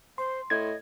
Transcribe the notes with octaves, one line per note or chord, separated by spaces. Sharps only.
C5 C6
A2 D#5 G#6